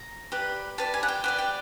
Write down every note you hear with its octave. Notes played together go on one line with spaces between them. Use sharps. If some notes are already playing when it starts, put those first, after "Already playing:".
Already playing: A#5
G4 B4 D5
G4 B4 D5 A5
G#5
F#5
G5
G4 B4 D5 F#5
G5